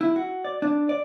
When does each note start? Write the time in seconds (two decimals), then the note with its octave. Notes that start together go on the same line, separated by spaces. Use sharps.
0.01 E4
0.16 F#4
0.45 D5
0.62 D4
0.89 D5